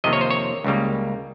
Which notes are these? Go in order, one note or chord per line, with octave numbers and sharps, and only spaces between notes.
F2 C3 D#3 A#3 D#5
C#5
C5
C#5
C#2 C#3 G3 A#3